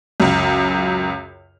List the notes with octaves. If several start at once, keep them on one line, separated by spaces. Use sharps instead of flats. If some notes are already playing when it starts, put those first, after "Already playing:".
C#2 F#2